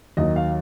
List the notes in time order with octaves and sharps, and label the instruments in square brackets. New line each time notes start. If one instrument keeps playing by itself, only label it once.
[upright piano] D#2 D#3 F#3 D#5
F5